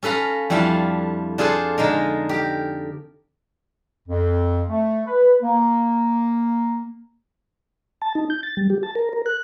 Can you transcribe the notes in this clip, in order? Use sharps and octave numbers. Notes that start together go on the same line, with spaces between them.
C#4 A4 B4 F5 A#5
F2 G3 D4 E4 F4 F5
D4 F4 G#4 A4 C5
D3 G#3 D#4 A#4
G4 A#4
F2
A3
B4
A#3
A5
D#4
G6
A6
G3
G4
A5
A#4
A#4
F#6